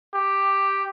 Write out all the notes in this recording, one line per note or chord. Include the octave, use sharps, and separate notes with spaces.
G4